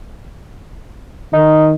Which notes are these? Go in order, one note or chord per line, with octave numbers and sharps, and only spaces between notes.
D#3 D#4